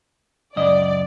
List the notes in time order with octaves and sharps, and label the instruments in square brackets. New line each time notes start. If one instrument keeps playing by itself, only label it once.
[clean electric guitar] C#2 F#2 D#5 [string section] D5